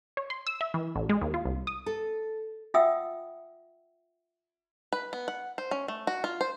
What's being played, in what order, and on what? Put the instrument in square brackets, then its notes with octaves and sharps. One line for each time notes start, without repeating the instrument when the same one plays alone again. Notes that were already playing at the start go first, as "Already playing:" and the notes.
[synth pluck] C#5
C6
E6
E5
E3
A1
G#3
D#2
F4
C2
D#6
[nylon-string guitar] A4
[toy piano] F4 E5 F#5 G5 D#6 E6
[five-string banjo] B4
B3
F#5
C5
C#4
A3
F#4
F4
C5